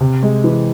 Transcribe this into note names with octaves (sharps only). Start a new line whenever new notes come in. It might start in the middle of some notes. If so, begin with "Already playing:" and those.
C3
G#3
E3